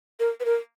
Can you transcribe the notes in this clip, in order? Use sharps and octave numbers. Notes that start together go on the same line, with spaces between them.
A#4
B4
A#4